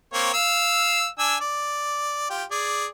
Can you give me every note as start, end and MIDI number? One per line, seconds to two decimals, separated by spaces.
0.13 0.31 58
0.13 0.31 60
0.13 0.31 73
0.33 1.06 77
0.33 1.06 88
1.19 1.35 62
1.19 1.35 80
1.19 1.35 88
1.40 2.25 74
2.30 2.44 65
2.30 2.44 67
2.51 2.86 68
2.51 2.86 74